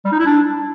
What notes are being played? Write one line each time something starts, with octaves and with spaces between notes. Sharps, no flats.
G3
D#4
E4
D4